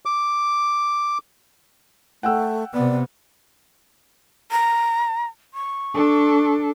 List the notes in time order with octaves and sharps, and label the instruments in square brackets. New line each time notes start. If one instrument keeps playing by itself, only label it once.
[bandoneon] D6
[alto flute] A3 [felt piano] F#5 G5 E6
[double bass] C3 B3 [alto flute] D5
[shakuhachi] A#5
C#6
[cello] D4 A4